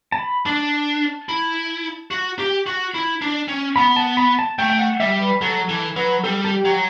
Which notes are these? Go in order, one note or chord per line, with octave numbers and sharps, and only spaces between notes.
A5
B5
D4 A5
E4
F#4
G4
F#4
E4
D4
C#4
B3 B5
A5
B5
A5
A3 G5
G5
F#5
G3 E5
B4
F#3 A4
E3 A4
F#3 B4
G3 A4
A4
G4
F#3